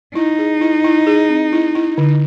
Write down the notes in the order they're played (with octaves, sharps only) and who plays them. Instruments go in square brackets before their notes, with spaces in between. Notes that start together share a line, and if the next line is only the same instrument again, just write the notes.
[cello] D#4 [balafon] E4
[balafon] G#4
E4
E4
G#4
C4
E4
E4
D3